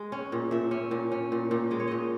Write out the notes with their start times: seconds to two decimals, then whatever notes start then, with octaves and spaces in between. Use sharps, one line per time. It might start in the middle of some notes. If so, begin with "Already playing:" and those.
Already playing: G#3
0.12 C#4
0.32 A#2
0.51 A#2 E5
0.71 C#4
0.91 A#2
1.11 C#4
1.32 A#2
1.51 A#2
1.71 G#3 D#5
1.80 C#5
1.88 A#2 D#5